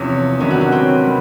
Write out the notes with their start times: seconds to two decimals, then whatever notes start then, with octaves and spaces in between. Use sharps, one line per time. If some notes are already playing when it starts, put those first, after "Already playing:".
Already playing: E2 C3 F3 C#4
0.40 C3 D#3 F#3 B3 C#4 D4
0.50 F#4
0.61 C#4
0.72 C4
1.03 C3 D#3 G3